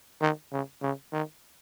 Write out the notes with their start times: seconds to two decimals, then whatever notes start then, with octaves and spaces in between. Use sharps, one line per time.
0.21 D#3
0.52 C#3
0.82 C#3
1.13 D#3